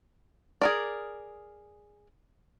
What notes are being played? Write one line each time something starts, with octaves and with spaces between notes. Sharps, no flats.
G#4 A#4 D5